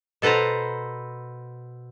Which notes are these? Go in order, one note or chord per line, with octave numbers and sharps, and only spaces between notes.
B2 A4 B4 C5 A#5